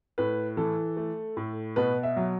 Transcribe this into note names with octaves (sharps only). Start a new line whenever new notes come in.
A2 B4
E3 A4
A3
A2
B2 B4
E5
F#3